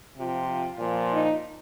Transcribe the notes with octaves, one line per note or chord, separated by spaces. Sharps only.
C3 F3 F4
A#2 F3
D#4